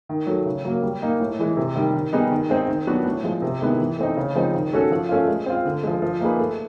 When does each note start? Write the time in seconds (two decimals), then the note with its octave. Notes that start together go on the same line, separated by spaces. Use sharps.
0.09 D#3
0.27 F#3 A3
0.46 C#3
0.65 F#3 A#3
0.83 G3
1.02 A#3 D#4
1.20 A2
1.39 E3 G#3
1.57 C3
1.76 D#3 G3
1.94 D#3
2.13 G3 B3 D#4 G#4
2.31 D#3
2.50 G#3 C4 D#4
2.68 D#3
2.87 F#3 B3 D4 F#4
3.05 A2
3.24 F3 G#3
3.42 C3
3.61 D#3 G#3 B3 E4
3.79 E3
3.98 A3 C4 D#4
4.17 C#3
4.35 F3 G#3 C4 D#4
4.54 D#3
4.73 G#3 C#4 F#4 A4
4.91 F3
5.09 A3 C#4 F4
5.27 G#3
5.46 C4 F4
5.65 D3
5.83 F3 G#3
6.02 F3
6.21 A#3 D#4 G#4 B4
6.39 A3